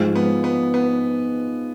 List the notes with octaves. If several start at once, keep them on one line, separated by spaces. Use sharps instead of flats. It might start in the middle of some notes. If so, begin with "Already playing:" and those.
Already playing: G#2 F3 G#3
B3
B3
B3